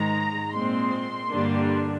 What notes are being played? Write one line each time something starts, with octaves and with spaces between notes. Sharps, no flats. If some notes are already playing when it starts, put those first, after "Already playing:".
Already playing: G#2 D#3 G#3 A#5
A#2 G#3 C4 C6
G2 D3 G3 A#3 D4